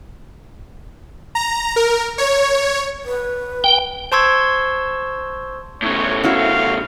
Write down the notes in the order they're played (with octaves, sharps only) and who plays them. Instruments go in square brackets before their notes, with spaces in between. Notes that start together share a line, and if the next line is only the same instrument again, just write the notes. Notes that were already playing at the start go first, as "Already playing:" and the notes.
[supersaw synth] A#5
A#4
C#5
[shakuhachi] B4
[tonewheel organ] G5
[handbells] C5 A5 C6 C#6 E6 G#6
[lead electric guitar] A2 C#3 [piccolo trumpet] C#5
[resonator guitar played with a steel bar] C#4 E4 F#4 [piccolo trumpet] F5